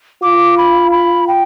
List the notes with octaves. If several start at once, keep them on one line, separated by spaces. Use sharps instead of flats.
F4 D6
B5
B5
G5